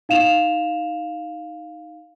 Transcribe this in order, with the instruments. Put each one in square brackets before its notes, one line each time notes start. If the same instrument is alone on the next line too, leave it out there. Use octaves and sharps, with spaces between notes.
[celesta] D#4 F5 E7 F7